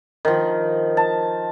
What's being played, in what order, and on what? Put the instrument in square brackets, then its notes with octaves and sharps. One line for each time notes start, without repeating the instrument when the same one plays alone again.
[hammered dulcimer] D#3 F3
A5